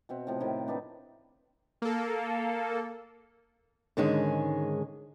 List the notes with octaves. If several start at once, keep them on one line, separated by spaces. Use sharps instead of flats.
B2 C4 E5 F#5
A2 C3 F3
A2 D#3 F3 E4
B3 D4 D#4 B4
A#3 A4
G#2 D3 D#3 G#3 C#4 G#4